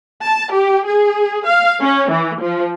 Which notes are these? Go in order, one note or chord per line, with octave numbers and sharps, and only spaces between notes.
A5
G4
G#4
F5
C#4
E3
F3